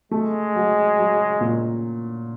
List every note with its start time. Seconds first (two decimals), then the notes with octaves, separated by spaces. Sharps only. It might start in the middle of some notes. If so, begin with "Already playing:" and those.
0.11 G#3 A3
0.55 F#3
0.98 F#3
1.41 A#2